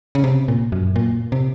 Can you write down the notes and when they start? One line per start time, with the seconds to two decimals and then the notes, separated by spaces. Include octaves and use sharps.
0.15 C#3
0.24 C3
0.48 A#2
0.72 F#2
0.96 A#2
1.32 C3